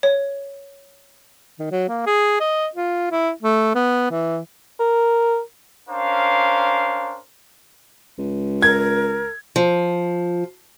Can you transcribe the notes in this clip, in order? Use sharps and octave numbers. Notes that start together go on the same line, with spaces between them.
C#5
D#3
F#3
A#3
G#4
D#5
F4
E4
A3
B3
E3
A#4
C#4 D4 A#4 C5 F5
C#2
A#4 G#6
F3